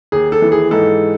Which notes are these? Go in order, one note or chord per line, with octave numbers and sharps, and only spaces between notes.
D#2 G#4
A4
E3
G#4
G#2 A4